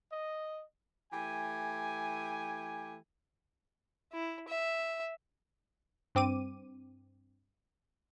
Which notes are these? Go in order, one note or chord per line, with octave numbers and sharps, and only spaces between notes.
D#5
E3 A3 G4 G#5
E4
E5
G2 C4 D6 D#7